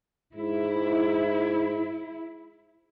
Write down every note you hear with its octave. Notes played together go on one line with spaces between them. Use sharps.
G#2 E4